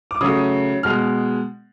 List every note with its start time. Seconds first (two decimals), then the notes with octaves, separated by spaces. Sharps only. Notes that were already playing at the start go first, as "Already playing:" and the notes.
0.11 D6
0.21 C#3 F#3 A3 D#6
0.83 B2 G#3 F6